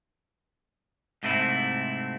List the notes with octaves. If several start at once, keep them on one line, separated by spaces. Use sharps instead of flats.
G#2 C3 A3 C4 E4